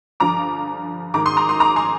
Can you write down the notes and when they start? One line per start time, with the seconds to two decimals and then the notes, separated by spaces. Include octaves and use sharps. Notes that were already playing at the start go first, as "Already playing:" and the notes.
0.20 G2 D3 F3 A#5 D6
1.14 G#2 D#3 A#5 D6
1.26 C6 D#6
1.37 A#5 D6
1.49 C6 D#6
1.60 A#5 D6
1.76 G#5 C6